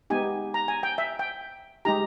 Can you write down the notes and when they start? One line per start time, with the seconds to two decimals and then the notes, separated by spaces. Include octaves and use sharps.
0.10 G#3 B3 D#4 G4 G#5
0.54 A#5
0.68 G#5
0.83 G5
0.98 E5
1.19 G5
1.85 G#3 D#4 G4 A#5